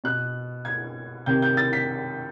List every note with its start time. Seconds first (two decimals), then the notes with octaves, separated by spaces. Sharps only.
0.04 B2 F#6
0.65 G#6
1.26 C3 D#3 G6
1.42 G6
1.57 A6
1.73 B6